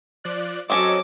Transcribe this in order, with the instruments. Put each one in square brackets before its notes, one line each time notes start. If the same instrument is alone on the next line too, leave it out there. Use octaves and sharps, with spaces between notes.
[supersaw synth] F3 D5 F#6
[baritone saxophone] F#3 [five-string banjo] C4 C#4 A4 [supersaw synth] D#5 [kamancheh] D6